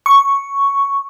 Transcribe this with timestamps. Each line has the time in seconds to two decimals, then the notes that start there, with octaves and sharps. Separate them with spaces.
0.06 C#6